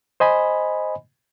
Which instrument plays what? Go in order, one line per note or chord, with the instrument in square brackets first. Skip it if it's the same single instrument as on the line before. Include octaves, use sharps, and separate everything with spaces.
[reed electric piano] C5 D#5 G#5 B5